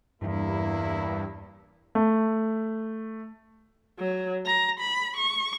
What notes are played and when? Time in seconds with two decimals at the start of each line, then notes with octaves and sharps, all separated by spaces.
0.22 E2 G2 E3 A#3 E4
1.95 A3
3.99 F#3
4.46 A#5
4.79 B5
5.17 C#6